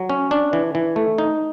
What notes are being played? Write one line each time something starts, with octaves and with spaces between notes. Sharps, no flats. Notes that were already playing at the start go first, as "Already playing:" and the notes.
Already playing: F#3
C#4
D4
E3
E3
A3
D#4